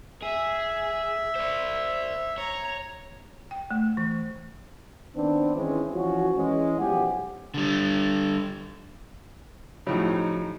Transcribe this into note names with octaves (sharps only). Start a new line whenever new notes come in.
G#4 E5
C5 D5
C#5 A#5
G5
A3
E3
D#3 B3 C4 D4
D#3 E3 G#3 C4 C#4 E4
E3 F3 C#4 F#4
E3 G#3 C#4
B1 E2 F3 G4 F#5 G#5
D3 G3
A2 C#3 F3 F#3 D#4